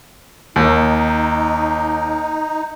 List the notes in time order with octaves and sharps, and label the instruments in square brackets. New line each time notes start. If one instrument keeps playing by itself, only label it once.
[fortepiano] D#2 [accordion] D#4